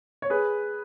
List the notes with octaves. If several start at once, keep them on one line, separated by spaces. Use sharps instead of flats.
C#5
G#4 B4